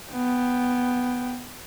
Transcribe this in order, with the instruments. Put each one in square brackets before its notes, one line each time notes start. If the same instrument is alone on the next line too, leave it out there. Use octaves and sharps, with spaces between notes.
[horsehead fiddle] B3 G5